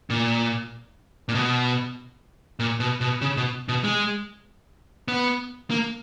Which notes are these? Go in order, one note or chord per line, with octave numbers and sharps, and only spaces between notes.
A#2
A#2
B2
A#2
B2
B2
C#3
B2
B2
G#3
B3
A#3